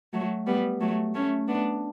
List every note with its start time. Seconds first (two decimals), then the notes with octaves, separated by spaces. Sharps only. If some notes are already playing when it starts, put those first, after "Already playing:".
0.13 F#3 A3
0.47 G3 B3
0.80 F#3 A3
1.14 A3 C#4
1.48 B3 D4